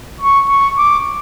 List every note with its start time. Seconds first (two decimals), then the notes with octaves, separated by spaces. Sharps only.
0.20 C#6
0.49 C#6
0.78 D6